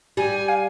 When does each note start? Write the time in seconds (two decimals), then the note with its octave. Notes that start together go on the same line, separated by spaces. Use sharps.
0.17 G3 G#5
0.49 F5